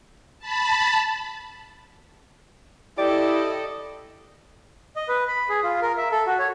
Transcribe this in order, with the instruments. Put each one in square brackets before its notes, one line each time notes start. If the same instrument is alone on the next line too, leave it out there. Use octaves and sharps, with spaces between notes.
[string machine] A5 B5
[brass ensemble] E4 [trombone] G4 [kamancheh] A4 D#5 [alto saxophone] D5
[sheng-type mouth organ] D#5
B4
B5
G#4
F4
A#4
E5
A4
F#4
C#5